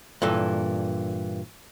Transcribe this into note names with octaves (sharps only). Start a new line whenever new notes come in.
G2 A#2 E3 A4